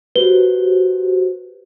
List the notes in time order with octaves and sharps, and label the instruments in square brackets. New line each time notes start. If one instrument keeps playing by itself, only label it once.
[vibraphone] F#4 G4 C5 [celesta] B4 G7